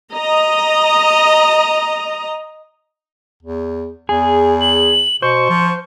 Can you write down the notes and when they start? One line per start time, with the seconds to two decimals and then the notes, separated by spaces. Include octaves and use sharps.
0.14 D#5 A#5
3.43 E2
4.09 E2 G#4
4.61 F#7
5.22 B2 C5 C#6
5.50 F3